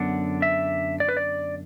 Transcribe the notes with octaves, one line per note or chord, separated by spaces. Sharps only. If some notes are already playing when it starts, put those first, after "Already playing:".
Already playing: F#2 D3 B3 D4 F#5
E5
D5
B4
D5